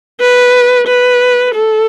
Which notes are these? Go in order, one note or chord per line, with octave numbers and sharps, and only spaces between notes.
B4
B4
A4